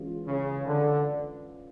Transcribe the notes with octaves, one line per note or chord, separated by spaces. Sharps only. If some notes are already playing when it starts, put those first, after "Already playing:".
Already playing: E3 G#3 C#4 F4
C#3
D3